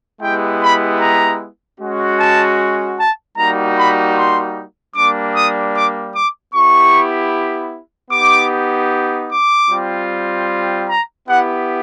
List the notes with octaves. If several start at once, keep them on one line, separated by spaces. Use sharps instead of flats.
G#3 B3 E4 G4 G5
B5
A#5
G#3 C#4 F#4
A5
A5
G3 A#3 D#4 F#4 A#5
B5
C6
G3 A#3 D4 D6
D#6
D6
D6
B3 E4 G4 C#6
B3 D#4 G4 D6
D6
G3 C4 F4
A#5
B3 E4 G4 F#5